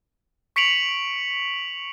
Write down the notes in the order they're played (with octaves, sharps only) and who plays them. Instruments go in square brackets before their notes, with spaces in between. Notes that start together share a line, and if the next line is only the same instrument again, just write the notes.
[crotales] C#6 B6 C#7 D7 F7 F#7